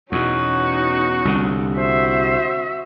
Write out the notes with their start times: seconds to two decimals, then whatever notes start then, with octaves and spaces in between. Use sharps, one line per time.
0.12 E2 B2 C#4 D#4 F#4
1.25 C2 D3
1.77 F#4 C5 E5